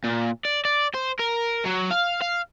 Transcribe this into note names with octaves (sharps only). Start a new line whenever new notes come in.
A#2
D5
D5
C5
A#4
F#3
F5
F5